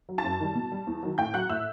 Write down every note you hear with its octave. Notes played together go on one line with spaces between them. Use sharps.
F#3
A5 A6
F#2
D#3 G3
B2
G3
E2
D#3 F#3
A2 G5 G6
F#3 F#5 F#6
A2 E5 E6